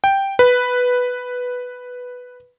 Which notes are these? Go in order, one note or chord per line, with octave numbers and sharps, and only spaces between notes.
G5
B4